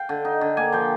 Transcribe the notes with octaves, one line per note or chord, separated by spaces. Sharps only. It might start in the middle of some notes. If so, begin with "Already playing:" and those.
Already playing: F5 G5
D3
D#4
D3
A#3 G#5
F3 G5